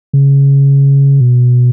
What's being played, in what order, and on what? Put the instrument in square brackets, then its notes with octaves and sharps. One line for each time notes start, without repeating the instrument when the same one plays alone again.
[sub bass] C#3
B2